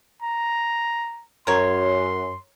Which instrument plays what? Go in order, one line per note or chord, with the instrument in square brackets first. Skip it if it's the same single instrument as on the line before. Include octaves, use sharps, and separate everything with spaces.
[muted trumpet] A#5
[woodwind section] F#2 [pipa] A#4 C#5 [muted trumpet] C6